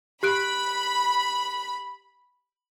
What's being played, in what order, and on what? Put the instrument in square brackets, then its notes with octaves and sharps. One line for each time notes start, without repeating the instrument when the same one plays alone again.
[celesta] G4 F#6 D7 [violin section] B5